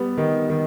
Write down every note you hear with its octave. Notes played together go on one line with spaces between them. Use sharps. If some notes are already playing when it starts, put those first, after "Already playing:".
Already playing: G3 B3
D#3
D#3